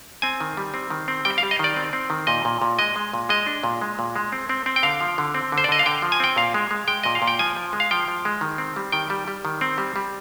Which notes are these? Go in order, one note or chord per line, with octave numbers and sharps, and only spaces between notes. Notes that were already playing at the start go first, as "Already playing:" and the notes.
C4 G#5
D#3
G3
C4
D#3
C4
G3 G5
F5
G3
D#5
D#3 D5
C4
C4
D#3
A#2 D#5
A#2
A#2
G#3 D#5
G#3
A#2
G#3 D#5
D4
A#2
G#3
A#2
G#3
C4
C4
C4
G5
D3 F5
F3
D3
C4
D3
C5
D5
D3 D#5
F5
D3 G5
F3
G#5
C4 G5
A#2 F5
G#3
G#3
G#3 G5
A#2 D#5
F5
A#2
G5
F3 G#5
F3
G#3
F5
F3 G5
F3
G#3
D#3
C4
G3
D#3 G5
G3
G3
D#3
C4
G3
G3